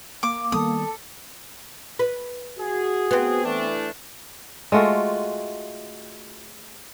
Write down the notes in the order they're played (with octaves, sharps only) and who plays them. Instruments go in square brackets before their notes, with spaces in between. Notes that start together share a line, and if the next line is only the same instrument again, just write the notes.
[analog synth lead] A#3 [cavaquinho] D6
[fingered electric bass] D#3 G3 B3 [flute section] A4 [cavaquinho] D#6
[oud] B4
[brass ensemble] F#4 G#4
[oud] B3 C4
[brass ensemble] E3 A3 D4
[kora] G#3 A3 F4 F#4